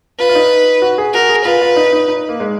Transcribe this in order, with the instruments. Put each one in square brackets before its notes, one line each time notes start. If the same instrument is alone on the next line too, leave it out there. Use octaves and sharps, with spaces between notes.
[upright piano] F4 [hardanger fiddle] B4
[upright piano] F4
D#4
F#4
G#4
[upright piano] F#4 [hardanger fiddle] A#4
[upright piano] G#4
[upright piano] F4 [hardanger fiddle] B4
[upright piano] F4
D#4
D#4
D#4
A#3
G#3